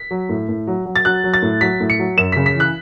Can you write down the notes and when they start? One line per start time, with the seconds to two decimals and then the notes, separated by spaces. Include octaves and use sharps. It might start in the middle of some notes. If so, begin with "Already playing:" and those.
Already playing: B6
0.11 F#3
0.29 A2
0.49 A2
0.67 F#3
0.86 F#3
0.96 A6
1.05 F#3 F#6
1.24 F#3
1.34 A6
1.42 A2
1.61 F#3 B6
1.80 A2
1.90 C#7
1.99 F#3
2.17 F#2 E7
2.32 C#3 B6
2.46 B6
2.55 E3 F#6